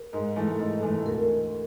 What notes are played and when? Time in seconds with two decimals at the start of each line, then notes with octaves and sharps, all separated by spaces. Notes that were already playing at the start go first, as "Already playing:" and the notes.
Already playing: A#4
0.13 G#2
0.36 E3 A3
0.59 G#2 A4
0.82 E3 A3
1.06 D2 A#4